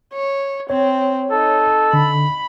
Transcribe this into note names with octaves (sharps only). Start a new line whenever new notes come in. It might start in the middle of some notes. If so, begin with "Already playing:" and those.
C#5
C4 C#5
D#4 A4
D3 B5